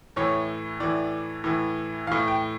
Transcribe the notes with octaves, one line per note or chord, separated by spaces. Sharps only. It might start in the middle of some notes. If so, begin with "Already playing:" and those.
A2 E3 C#5
A2 E3 D5
A2 E3
A2 E3 F5
G5